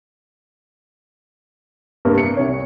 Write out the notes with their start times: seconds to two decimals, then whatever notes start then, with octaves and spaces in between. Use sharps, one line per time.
2.05 G2 C3 A#3
2.18 C#7
2.37 C2 C#5